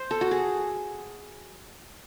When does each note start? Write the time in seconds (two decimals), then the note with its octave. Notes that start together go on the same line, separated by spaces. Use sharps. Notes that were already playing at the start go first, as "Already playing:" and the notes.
Already playing: C5
0.11 A4
0.21 F#4
0.31 G#4